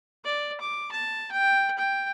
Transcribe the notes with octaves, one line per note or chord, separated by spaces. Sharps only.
D5
D6
A5
G5
G5